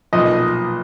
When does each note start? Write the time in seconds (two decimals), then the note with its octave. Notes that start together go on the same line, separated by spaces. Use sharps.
0.13 B1 A#2 F3 D#5